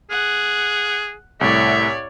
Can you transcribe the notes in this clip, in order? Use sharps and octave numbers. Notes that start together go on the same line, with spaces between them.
G#4 F#5
C2 A2 C#5 D5 E5